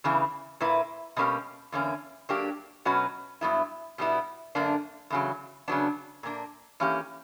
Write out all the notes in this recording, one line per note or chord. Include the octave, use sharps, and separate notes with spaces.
E2 C#3 E3
A#2 A#3 E4 B4
B2 G3 A#3 C#4 G4
E2 D3 A#3 C#4
F#3 A#3 D4 G4
B2 F#3 C#4 F#4 B4
G2 F#3 B3 E4
B2 G3 B3 E4
F#2 D3 A#3 D4
E2 C#3 F#3
C#3 F#3 B3 D4
A#2 A#3 D4
E3 A#3 C#4 G4